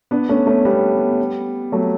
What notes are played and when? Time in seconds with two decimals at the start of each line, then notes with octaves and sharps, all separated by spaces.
0.11 B3 D4
0.29 A3 C#4
0.47 A3 C#4
0.65 G3 B3
1.72 F#3 A3